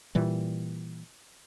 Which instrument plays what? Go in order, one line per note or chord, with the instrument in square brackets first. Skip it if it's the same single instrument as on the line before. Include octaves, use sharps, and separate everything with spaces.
[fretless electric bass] A#2 E3 G3